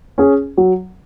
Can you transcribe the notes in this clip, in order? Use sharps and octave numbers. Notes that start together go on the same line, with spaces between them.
C#4 G#4
F#3